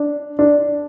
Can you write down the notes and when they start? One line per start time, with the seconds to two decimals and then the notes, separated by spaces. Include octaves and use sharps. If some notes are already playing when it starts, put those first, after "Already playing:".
Already playing: D4
0.39 D4